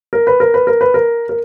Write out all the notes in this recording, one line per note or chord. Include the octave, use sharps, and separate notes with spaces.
A#4
B4
A#4
B4
A#4
B4
A#4
A#4